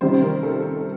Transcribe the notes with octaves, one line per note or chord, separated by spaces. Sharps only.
C3 D#3 G3 C5
A#4
A4